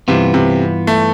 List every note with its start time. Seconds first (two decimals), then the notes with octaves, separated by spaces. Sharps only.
0.08 G2 C3 E3 B3 F4
0.34 C3
0.87 A3